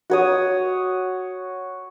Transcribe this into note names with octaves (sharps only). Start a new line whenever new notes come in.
F#4 C#5 D#6